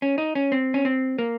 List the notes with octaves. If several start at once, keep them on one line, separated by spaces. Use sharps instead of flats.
C#4
D#4
C#4
C4
C#4
C4
A#3